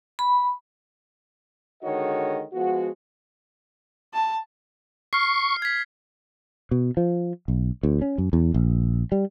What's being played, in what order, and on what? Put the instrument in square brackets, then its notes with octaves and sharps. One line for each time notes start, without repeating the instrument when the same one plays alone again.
[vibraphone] B5
[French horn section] D3 D#3 G#3 F#4 C#5 D#5
F3 G#3 B3 F#4
[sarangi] A5
[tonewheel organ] C#6 [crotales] F6 C7
[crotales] G#6 B6
[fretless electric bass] B2
F3
B1
D2
C#4
F#2
E2
A#1
G3